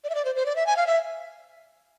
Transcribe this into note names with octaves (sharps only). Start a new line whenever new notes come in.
D5
E5
D5
C5
C5
D5
E5
G#5
F5
E5